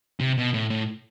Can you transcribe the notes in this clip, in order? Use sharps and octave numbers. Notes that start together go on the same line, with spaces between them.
C3
B2
A2
A2